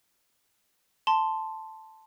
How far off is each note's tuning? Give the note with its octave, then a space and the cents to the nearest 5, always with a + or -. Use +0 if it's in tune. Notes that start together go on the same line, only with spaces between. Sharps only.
A5 +0 C6 +0